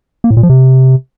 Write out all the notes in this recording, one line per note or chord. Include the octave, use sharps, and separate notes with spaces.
A#3
A2
A#2
F3
C3